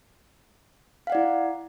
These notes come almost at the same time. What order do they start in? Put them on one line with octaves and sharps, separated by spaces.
F5 F#5 D5 E4